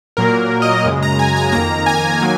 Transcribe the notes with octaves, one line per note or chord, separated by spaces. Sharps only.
A#2 F#3 A#3 A#4
D#5
F#2 C#3 G#3
A#5
G#5
A#5
F2 D#3 A#3 A#5
G#5
D#3 F#3 A#3 G#5